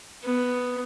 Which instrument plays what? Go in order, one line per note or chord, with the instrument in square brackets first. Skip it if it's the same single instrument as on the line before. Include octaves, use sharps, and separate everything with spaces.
[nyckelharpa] B3